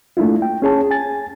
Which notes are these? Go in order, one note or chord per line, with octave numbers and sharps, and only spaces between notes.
A3 A#3 D4 E4 F4
G5
C#4 G#4 C#5 A5
G#5 A6